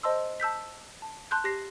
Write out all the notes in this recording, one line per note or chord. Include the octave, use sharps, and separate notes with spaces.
C5 D#5 A5 C6 E6
A5 E6 G6 B6
A5
A5 C6 F#6 G6
G4 A#6 C7